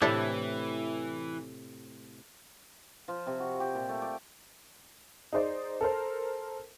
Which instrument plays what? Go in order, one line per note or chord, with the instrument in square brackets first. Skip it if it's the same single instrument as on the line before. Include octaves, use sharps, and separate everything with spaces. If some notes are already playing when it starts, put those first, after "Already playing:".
[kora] A2 C3 [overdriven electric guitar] E3 [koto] D4 E4 A4
[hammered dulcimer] F3
C3
F#4
G4
A#2
A3
D5
[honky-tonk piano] D#4 G#4 C5 D5
A4 A#4 C5